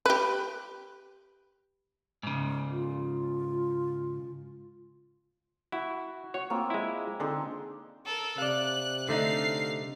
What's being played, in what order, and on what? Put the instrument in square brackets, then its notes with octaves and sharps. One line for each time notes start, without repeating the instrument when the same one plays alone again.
[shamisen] G4 B4
[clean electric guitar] G#2 C#3
[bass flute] F4
[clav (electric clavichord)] E4 [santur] F#4
[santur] F#4 [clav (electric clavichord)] C#5
[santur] A#3 C4 F4
[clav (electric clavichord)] G#3 E4
[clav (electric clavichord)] D3 [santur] C4 D#4 G#4
[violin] A4 A#4
[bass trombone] C3 [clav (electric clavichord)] D5 F5 [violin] F#6
[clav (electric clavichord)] D3 A3 D#4 [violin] F5 C7